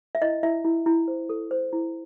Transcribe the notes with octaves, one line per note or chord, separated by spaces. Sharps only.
E5
E4 D#5
E4 E5
E4
E4
C5
A4
C5
E4